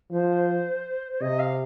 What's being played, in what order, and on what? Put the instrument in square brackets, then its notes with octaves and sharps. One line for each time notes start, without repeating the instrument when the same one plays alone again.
[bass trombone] F3 [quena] C5
[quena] C5
[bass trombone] C3 [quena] D#5
[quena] F5